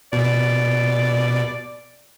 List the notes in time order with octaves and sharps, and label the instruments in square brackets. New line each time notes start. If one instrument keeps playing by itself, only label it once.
[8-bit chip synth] B2 [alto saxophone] D5